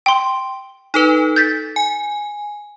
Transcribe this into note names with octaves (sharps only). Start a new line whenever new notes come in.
G5 C6
D#4 A4 B4
G6 A6 B6
G#5